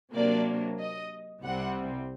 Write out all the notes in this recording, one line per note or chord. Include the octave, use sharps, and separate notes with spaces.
C3 F#3 A#3 D4 D5
D#5
C2 C3 G3 C4 F#5